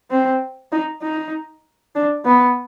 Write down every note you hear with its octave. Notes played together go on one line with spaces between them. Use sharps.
C4
D#4
D#4
D4
B3